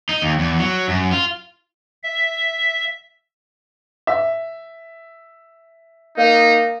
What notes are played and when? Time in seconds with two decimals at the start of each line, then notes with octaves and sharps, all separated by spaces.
0.09 D#4
0.22 D#2
0.39 E2
0.58 F#3
0.88 F#2
1.12 F4
2.03 E5
4.07 E5
6.17 A#3 D#4